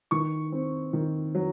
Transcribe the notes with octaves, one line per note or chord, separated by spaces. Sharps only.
D#3 C#6
C4
D#3
F#3